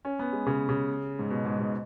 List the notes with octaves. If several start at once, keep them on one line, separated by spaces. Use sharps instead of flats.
C#4
B3
G#3
C#3
C#3
G#2
B2
G#2
G#2